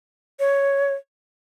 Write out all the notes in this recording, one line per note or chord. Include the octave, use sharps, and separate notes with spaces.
C#5